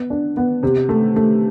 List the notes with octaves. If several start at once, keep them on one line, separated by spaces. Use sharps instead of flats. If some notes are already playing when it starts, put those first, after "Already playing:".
Already playing: B3
D4
B3
C3
A3
A3